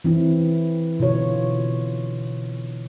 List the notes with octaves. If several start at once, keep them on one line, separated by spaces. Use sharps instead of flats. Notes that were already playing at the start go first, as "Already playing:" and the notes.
E3 C4 E4
B2 D3 F4 C#5